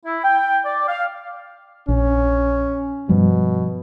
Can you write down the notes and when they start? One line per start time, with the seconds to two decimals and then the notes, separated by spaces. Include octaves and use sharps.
0.05 E4
0.23 G5
0.64 D5
0.88 F5
1.88 A#1 C#4
3.09 G2 B2 F3 G3